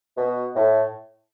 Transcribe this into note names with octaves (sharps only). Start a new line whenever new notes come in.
B2
A2